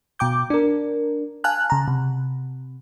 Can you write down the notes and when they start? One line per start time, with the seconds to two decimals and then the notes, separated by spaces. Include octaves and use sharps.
0.19 B2 G5 D6 G6
0.50 D4 A#4
1.44 F5 G#5 A5 F6 F#6
1.70 C#3 A5 A#5
1.88 C3